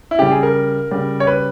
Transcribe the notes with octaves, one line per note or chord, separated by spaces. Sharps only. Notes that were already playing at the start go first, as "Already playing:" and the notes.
E4
C#3 G3 G4
G#4
A#4
C#3 G3
C#5
B4